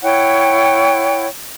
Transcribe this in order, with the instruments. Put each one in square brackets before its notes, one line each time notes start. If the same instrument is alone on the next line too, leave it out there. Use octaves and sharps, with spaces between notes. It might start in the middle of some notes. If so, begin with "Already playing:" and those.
[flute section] E4 C#5 F#5 G5